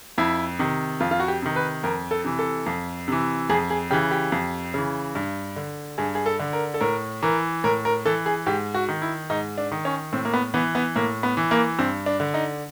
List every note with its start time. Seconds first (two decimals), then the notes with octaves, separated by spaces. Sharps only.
0.18 F2 E4
0.59 C3 D#3
1.00 F2 F4
1.11 F4
1.20 F#4
1.28 G4
1.42 C3 D#3
1.56 B4
1.83 F2 A#4
2.11 A4
2.24 C3 E3
2.39 A4
2.66 F2
3.08 C3 E3
3.50 F2 G#4
3.70 G#4
3.91 C#3 E3 G4
4.11 G4
4.32 F2
4.74 C#3 E3
5.15 G2
5.56 D3
5.98 G2 G#4
6.15 G#4
6.26 A4
6.39 D3
6.53 A#4
6.74 A4
6.80 A2 A#4
7.23 E3 A#4
7.64 A2 A#4
7.85 A#4
8.06 E3 A4
8.26 G#4
8.46 G#2 G4
8.74 F#4
8.88 D#3
9.02 E4
9.30 G#2 D#4
9.58 D4
9.72 D#3
9.85 C#4
10.13 A2 C4
10.25 A#3
10.34 B3
10.54 E3 B3
10.75 B3
10.96 A2 A#3
11.23 B3
11.37 E3
11.51 A#3
11.79 G2 C4
12.06 D4
12.20 D3
12.34 D#4